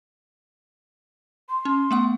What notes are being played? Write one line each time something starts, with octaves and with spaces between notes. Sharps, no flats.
C6
C#4
A3 B3 F#5